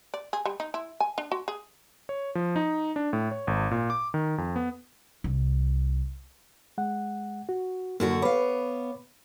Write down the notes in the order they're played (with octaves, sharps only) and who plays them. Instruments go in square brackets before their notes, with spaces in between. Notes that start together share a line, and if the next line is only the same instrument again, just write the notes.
[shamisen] D5
G#4
G3
D#4
E4
G#5
D4
F#4
G#4
[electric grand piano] C#5
F3
D#4
D4
A2
C#5
G#1
A#2
D6
D#3
F2
B3
[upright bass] C2
[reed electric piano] G#3 F#5
F#4
[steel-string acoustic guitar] F#2 D3 F#4 [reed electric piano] A#3
[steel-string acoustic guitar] B3 F5 [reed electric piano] C#5 B5 D6